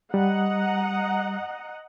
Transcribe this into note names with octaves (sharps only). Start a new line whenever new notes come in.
G3 D#5 F#5 A#5